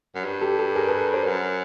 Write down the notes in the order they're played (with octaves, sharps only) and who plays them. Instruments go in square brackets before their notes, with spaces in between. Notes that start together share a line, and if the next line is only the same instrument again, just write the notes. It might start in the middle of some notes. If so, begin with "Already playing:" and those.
[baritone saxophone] F#2
G2
[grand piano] G4 A4
G4 A4
G#4 A#4
A4 B4
A#4 C5
[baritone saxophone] F#2